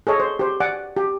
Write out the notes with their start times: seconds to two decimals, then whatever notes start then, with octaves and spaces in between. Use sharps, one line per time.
0.07 G#4 A4 C#5 D#5
0.20 C5
0.39 G4 C5
0.60 D5 F#5 G#5 D6
0.97 G4